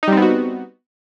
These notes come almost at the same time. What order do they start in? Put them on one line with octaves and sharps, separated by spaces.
D#4 G3 C4 B3 F#4